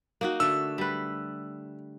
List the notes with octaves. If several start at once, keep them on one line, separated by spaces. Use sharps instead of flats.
A#3 D#4 F#4
D3 A3 E6
G3 B4